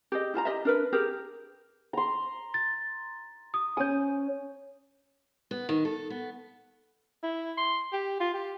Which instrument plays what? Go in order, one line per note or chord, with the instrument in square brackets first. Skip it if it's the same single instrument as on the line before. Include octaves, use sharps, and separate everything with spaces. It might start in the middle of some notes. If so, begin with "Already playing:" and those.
[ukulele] G4 G#4 D#5
E4 F4 A5 A#5
G4 D#5 E5
D4 A#4 B4
G4 G#4 A#4
[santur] A#5 C6
[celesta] A6
D#6
[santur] C#4 D#6 [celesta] G#5 G6
[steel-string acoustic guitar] B3
D#3
A4
B3
[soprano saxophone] E4
C6
G4
F4
G4